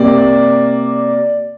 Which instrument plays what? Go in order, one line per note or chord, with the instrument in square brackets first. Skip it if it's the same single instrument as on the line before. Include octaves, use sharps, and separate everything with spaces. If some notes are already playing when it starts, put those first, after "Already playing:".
Already playing: [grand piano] C3 A#3 D5